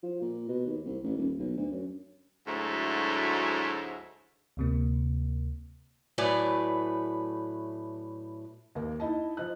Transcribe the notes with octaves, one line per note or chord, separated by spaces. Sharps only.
F3
A#2
B2
D#2
C2
A1
D#1
B1
D2
F#2
D2 G#2 F#3 A3 E4
D2 C3 A#3
A2 F#3 A3 B4 D5 G#5
D#2 A#3
D#4 E4 D#5 A5
F3 D#5 F#6